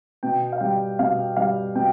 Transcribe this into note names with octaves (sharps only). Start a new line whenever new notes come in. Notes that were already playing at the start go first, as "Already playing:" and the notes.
B2 G5
F5
G3 G5
B2 F5
G3 F5
B2 G5